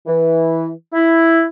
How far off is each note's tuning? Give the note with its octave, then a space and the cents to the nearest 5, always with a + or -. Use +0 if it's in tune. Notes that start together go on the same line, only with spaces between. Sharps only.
E3 -10
E4 +0